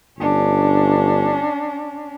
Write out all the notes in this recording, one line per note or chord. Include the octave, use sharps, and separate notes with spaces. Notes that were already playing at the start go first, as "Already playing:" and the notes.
G1 C#4 D4